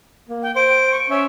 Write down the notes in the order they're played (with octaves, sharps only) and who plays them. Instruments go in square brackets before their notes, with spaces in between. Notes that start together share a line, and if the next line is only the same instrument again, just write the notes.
[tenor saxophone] A#3
[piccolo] G5
[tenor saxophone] C5 [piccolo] D7
[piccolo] C#6
[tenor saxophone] C#4 [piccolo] E5